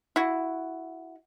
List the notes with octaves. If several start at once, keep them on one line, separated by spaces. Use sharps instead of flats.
E4 F#4